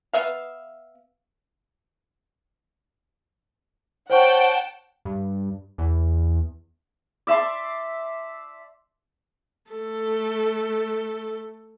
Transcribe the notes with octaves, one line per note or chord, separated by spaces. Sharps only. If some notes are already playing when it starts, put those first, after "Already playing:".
B3 E5 F5
C5 C#5 F#5 G5 A5 C#6
G2
E2
D5 E5 A5 C6
A3 A4